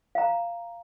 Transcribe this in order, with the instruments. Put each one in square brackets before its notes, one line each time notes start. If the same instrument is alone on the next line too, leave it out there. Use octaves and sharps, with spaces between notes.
[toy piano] F5 A#5